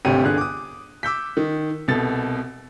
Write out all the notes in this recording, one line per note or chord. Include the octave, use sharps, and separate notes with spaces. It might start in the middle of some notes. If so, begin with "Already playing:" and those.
G#1 D2 C3 G4 C#5 D#7
G1 D3 G#4 F#6
D6 D#6
D6 E6 G6 B6
D#3
C2 B2 A4 A6